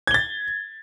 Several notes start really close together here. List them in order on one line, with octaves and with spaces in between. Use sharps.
G#6 G7 A6